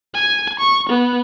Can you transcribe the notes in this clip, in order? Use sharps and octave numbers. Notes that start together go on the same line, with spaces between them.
G#5
C#6
B3